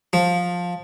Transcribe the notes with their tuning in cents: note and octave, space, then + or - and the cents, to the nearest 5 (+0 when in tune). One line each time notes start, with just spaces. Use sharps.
F3 +15